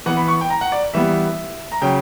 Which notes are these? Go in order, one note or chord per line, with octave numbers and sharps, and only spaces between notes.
E3 B3 F#5
B5
C#6
G5
A#5
F#5
D5
E3 G3 B3 E5
A#5
C#3 F#3 C#4 G5